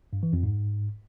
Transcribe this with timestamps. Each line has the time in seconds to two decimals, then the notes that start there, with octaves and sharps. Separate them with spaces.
0.13 G2
0.23 E3
0.33 F2
0.43 G#2